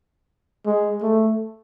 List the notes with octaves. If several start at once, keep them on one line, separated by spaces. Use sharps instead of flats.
G#3
A3